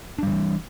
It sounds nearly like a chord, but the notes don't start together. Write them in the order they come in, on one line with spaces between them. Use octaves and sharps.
D4 G3 D3 E3